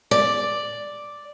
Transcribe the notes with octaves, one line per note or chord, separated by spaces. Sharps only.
D5